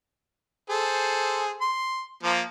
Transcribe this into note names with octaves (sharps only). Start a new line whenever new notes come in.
G#4 A4 C5
C6
F3 A#3